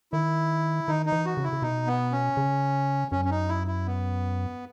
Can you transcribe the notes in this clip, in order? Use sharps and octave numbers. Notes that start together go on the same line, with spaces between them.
D#3 E4
D#3 D#4
D#4
E3
F#4
C#3
E4
C#3
B2 D#4
B3
C#4
C#3
F#2 C#4
C#4
D#4
E4
E4
B3